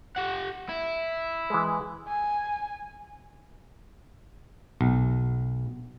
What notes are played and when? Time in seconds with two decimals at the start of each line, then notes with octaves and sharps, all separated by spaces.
0.17 G4 F#5
0.69 E4
1.50 E3 G#3
2.08 G#5
4.81 B1